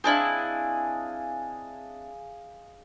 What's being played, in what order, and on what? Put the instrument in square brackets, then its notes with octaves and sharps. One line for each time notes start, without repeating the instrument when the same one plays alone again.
[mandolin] C4 D4 E4 [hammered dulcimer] G#4 D#5 F5